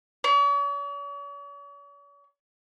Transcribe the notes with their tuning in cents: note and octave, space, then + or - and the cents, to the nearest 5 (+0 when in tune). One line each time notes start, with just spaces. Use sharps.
C#5 +45